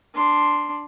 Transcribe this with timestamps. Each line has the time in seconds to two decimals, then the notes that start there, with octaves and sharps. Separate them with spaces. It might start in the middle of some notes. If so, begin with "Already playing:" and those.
0.14 D4 C6